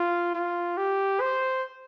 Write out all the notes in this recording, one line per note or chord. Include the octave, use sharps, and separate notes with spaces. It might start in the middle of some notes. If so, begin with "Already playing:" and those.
Already playing: F4
F4
G4
C5